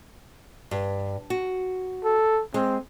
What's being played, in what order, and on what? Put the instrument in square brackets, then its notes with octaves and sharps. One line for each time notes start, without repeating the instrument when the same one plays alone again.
[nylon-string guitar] G2
F#4
[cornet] A4
[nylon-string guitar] G#3 [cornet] C4